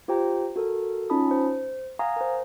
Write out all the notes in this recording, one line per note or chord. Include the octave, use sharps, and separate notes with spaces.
F4 G4 C5 G5 A#5
F#4 A4 A#4
C#4 D#4 F4 A5 B5 D#6
C5
F5 F#5 G#5 A#5 C6 D#6
A#4 C5